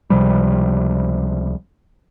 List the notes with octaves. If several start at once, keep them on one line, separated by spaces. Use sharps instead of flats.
C#2 C3 F3 G3